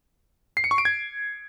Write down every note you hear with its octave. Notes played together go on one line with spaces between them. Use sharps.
C7
C#7
C#6
D7
G#6